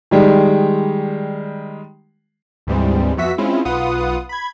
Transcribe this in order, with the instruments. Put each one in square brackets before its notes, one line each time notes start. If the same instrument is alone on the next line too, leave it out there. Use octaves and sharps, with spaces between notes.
[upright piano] D#3 G3 G#3
[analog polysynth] D2 G#2 E3 G3 G#3 C4
F2 B3 F#4 E5 B6
G#3 C4 C#4 E4 F4
B1 F4 B4 F#5 D#6
B5 G#6